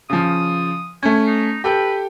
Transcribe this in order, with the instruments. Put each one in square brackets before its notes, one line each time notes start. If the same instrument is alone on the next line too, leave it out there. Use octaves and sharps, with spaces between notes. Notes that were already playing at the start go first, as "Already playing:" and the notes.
[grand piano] C#3 F3 [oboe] D#6
[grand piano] A3 C#4 [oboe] G#5
[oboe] D#4
[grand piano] G4 A4 G5 [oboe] B4